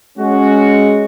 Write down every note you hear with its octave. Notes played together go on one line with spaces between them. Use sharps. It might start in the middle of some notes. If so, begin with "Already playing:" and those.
G#3 C#4 F#4